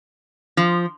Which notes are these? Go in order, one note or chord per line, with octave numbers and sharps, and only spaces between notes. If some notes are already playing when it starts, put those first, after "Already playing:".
F3